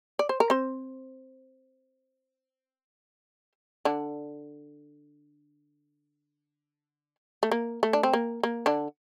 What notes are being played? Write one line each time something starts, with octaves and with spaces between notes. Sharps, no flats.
D5
C5
A#4
C4 C5
D3 D4
A3
A#3
A3
D4
C4
A#3
A#3
D3 D4